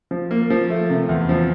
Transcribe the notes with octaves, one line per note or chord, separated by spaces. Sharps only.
F3
A#3
F3
A3
C3
E2
F3